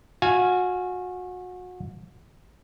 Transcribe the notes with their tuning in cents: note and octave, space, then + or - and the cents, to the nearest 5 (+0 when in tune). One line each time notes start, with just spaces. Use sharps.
F#4 -30 F5 -10 G#5 +0